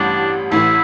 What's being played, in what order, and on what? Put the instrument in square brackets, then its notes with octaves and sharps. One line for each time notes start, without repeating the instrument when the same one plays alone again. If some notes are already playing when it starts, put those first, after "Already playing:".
Already playing: [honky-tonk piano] A1 G2 G3 G4 [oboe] D4
[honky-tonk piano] A1 A2 E3 [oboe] E4